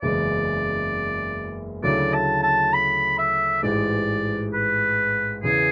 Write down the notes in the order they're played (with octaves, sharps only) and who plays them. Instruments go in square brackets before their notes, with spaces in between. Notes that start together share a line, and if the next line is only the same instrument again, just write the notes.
[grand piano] F#1 E2 C#3 G#3 [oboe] D5
[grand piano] D2 C#3 F#3 A3 E4 [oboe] D5
[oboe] A5
A5
B5
E5
[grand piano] A1 G#2 E3 G#3 [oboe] D5
[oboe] B4
[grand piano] E2 C#3 E3 B3 [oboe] G#4